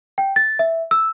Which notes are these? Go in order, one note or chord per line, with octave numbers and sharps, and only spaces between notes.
G5
A6
E5
E6